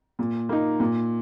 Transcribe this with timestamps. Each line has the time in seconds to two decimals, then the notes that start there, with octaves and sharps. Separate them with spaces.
0.19 A#2
0.49 A#3 D#4
0.80 A#2